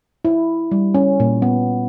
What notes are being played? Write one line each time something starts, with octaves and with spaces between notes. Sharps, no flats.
E4
G3
C#4
A#2
B3